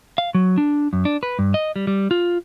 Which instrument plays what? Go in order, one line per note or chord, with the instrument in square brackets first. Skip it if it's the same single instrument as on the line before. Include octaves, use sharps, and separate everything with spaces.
[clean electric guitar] F5
F#3
D4
F#2
D4
B4
G2
D#5
G3
G3
F4